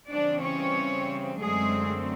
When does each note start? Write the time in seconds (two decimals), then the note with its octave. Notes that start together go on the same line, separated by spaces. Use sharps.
0.11 C#3 E3 G3 C4 D4 D5
0.44 C#4 C#5
1.40 F#2 D3 F#3 G#3 A3 C4 G#4